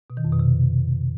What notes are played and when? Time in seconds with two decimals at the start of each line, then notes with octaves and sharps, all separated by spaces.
0.10 B2
0.17 D#3
0.25 F2
0.32 B2
0.39 C3